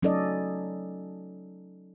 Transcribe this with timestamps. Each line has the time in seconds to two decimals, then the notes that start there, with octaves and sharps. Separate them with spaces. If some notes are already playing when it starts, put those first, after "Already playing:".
0.03 F#3 C#4 D#4 A4 D5 D#5